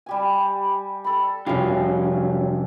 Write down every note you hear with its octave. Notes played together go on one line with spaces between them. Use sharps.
G3 G4 G#5
A4 B5
F1 G2 F#3 C#4 F4 G4